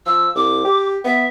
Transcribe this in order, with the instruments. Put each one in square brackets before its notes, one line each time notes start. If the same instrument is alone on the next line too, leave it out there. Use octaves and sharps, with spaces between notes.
[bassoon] F3 [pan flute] E6
[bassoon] C2 [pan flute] D6
[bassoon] G4
[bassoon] B3 [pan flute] E5